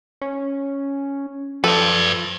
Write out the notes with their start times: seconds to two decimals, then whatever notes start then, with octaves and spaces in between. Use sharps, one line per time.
0.21 C#4
1.64 F3 A4 B4 D5